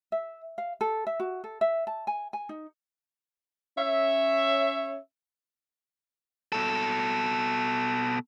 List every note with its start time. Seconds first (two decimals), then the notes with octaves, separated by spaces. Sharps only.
0.12 E5
0.58 F5
0.81 A4
1.07 E5
1.20 F#4
1.44 A4
1.61 E5
1.87 A5
2.07 G#5
2.33 G#5
2.49 D#4
3.78 C#4 C#5 E5
6.52 B2 A4